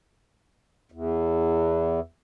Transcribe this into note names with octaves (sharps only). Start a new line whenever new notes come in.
E2